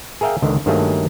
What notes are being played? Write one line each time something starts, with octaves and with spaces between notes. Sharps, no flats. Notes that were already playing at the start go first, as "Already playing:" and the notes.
G#4 A#4 E5 F5 G5
C#2 D3 D#3
G2 D#3 F#3 A3 A#3 G#4